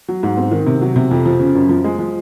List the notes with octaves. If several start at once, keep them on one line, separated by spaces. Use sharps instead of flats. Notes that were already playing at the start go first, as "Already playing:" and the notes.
F#3
G#2
C4
D#3
C3
F#3
C3
F2
F3
C#3
F#2
F3
G#3
F3